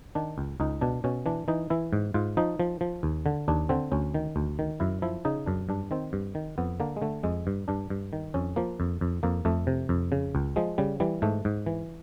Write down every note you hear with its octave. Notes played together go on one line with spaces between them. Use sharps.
D#3 D4
C#2
C#2 D#4
B2 D4
B2 C#4
E3 D4
E3 D#4
E3 E4
G#2
G#2 F4
F3 D#4
F3
F3
D#2
D3
D#2 D4
D3 C4
D2 C#4
D#3
D2
D#3
F#2 E4
F3 E4
C#3 D#4
F#2 D4
G2 D4
D#3 C4
G2
D#3
F2 B3
D3 A#3
G#3
D3 A3
F2 G#3
G2
G2 D4
G2
D#3
F2 C#4
F3 A#3
F2
F2
F2 A#3
F2 A3
C3
F2
C#3
C#2
F3 G#3
C#3 G3
E3 G3
G#2 A3
G#2
E3